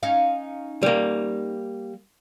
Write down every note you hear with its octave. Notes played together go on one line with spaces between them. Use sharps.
C#4 D#4 F5
G3 A#3